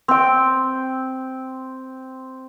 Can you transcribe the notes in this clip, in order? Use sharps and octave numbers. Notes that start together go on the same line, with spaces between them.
C4 G5